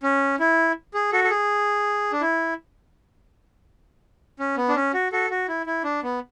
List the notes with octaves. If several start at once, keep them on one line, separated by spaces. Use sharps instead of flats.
C#4
E4
G#4
F#4 A4
A4
G#4
D4
E4
C#4
B3
D4
C#4
F#4
F#4 A4
F#4
E4
E4
D4
B3